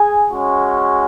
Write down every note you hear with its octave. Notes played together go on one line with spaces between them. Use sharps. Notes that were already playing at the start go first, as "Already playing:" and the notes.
Already playing: G#4 G#5
G#3 C#4 F#4